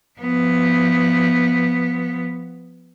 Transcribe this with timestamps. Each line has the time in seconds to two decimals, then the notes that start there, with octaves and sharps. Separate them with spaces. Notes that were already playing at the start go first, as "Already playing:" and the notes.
0.20 F3 B3